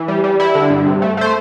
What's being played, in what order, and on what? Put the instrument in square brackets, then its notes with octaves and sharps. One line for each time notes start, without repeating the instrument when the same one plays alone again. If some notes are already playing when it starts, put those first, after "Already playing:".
Already playing: [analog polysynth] E3
G3
G3
G3 E4
D3
G2
C3
A3
A3 C5